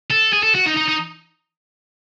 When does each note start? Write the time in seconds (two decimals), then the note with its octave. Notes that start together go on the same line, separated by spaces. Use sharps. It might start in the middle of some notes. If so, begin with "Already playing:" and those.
0.10 A4
0.33 G#4
0.43 A4
0.55 F#4
0.66 D#4
0.77 D#4
0.89 D#4